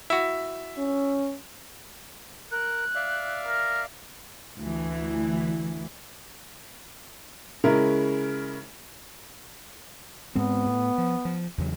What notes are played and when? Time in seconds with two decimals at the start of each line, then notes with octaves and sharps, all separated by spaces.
0.10 E4 F#4 E5
0.78 C#4
2.51 A#4 F#6
2.95 D5 E5 F5
3.46 A#4
4.57 D2 E3
7.64 C#3 G#3 C#4 E4 A#4
10.35 G#2 G#3 B3 C4
10.66 A2
10.98 F3
11.25 F3
11.58 E2 C#3 F#3